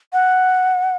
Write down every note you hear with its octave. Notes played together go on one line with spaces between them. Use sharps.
F#5